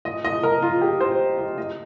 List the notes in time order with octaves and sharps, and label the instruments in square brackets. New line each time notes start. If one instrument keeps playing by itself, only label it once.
[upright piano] D#5
D#5
A#4
F4
G4
C5
D#5
D#5